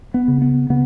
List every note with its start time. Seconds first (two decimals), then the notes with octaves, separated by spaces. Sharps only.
0.14 B3
0.28 C#3
0.42 B3
0.70 C#3 B3